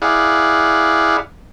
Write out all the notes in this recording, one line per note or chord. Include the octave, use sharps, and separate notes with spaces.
E4 G#4 D5 F5 F#5